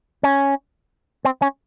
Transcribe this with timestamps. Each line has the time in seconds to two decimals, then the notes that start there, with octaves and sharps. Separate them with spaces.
0.23 C#4
1.25 C4
1.42 C#4